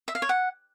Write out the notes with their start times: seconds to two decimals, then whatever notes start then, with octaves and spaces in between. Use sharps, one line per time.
0.08 E5
0.15 F5
0.22 C#5
0.29 F#5